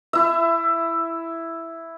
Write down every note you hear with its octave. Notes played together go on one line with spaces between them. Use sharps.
E4 E5